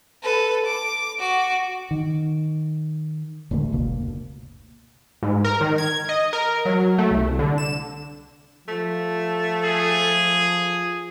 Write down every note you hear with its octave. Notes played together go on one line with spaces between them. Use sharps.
A4 B4
D6
F#4 D6
D#3
D1 D#2 D3 A3
F#1 C#2 B2 A#3
G#2
A#4
D#3
G#6
D#5
A#4
F#3
A3
C2
D3
E7
F3 A3
G#4